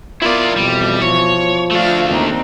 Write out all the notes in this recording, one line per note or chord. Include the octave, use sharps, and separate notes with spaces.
B3 E4 F4 A#4 D5
F2 B2 E3 G3
F3 C#5
A3 D4 F4 F5
D#2 C4 D#4